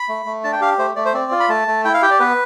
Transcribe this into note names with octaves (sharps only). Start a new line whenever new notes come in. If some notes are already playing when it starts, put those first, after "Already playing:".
Already playing: B5
A3
A3
D4 A5
G5
G4 F5
A3 C5
A3 D5
C5
C4 D5
F4
B5
A3 A5
A3
E4 G5
F5
G4 G5
D5
B3 B4